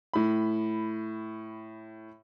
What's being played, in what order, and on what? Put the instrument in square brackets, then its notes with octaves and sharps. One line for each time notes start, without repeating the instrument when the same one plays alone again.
[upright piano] A2 B5